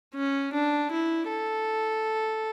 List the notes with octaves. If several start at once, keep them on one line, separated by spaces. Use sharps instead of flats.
C#4
D4
E4
A4